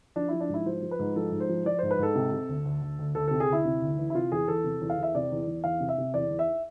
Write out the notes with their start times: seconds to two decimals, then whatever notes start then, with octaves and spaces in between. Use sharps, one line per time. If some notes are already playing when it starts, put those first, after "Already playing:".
0.16 F3 D4
0.29 F3 E4
0.40 D4
0.49 G#2 E4
0.66 F3 C5
0.83 F3
0.91 B4
0.99 G#2
1.16 F3 A4
1.32 G#2
1.40 C5
1.49 F3
1.65 F3 D5
1.79 G#2 C5
1.91 B4
1.99 G#2 A4
2.15 C3
2.32 C3
2.49 D2
2.65 D2
2.82 D2
2.99 D2
3.15 D2 A4
3.28 C3 A4
3.40 G#4
3.48 D2 E4
3.65 C3
3.82 D2
3.98 E3
4.10 E4
4.15 C3 F4
4.32 E2 G#4
4.48 E2 A4
4.64 C3
4.81 E2
4.90 F5
4.98 E2 E5
5.15 C3 D5
5.32 E2
5.47 E2
5.64 E2 F5
5.80 C3
5.89 E5
5.98 C3
6.14 E2 D5
6.30 E2
6.39 E5